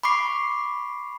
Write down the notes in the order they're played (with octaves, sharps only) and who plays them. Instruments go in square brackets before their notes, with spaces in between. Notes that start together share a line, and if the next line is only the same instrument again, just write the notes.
[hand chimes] B5 C#6 D6 C7